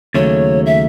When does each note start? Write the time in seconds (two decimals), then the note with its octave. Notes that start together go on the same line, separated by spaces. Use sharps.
0.14 D#2 C#3 F#3 A3 C#5
0.66 E5